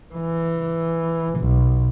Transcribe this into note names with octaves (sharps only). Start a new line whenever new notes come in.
E3
B1